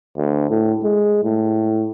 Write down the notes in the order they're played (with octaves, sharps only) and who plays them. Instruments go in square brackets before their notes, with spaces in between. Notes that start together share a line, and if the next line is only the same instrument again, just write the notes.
[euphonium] D2
A2
G#3
A2